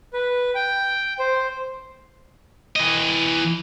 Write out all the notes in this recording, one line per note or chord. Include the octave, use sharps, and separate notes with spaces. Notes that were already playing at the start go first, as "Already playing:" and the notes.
B4
G5
C5
E3 D#5